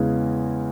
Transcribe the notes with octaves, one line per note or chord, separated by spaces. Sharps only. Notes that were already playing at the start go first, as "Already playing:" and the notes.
Already playing: E2 C#3 E3 G#3